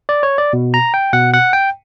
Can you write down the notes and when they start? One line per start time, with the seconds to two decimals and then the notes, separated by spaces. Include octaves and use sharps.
0.09 D5
0.23 C#5
0.38 D5
0.53 B2
0.74 A#5
0.94 G5
1.13 B2 F#5
1.34 F#5
1.53 G5